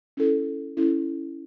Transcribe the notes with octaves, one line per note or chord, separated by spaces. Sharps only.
C#4 E4 A4
C#4 E4 A4